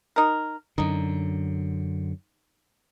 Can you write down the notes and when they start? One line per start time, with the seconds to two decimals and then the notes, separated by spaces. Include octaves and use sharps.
0.16 D#4 A#4
0.78 F#2 D3 D#4